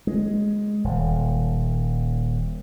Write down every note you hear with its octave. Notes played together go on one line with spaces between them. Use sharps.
G#3
D#1